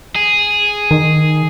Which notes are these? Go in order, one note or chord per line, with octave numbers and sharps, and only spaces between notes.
G#4
D#3